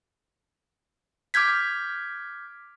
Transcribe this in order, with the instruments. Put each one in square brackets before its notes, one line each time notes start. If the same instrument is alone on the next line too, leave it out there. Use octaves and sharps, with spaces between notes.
[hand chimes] D6 F6 G6 G#6 B6